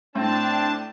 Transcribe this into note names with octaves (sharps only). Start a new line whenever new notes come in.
A2 C4 D4 A5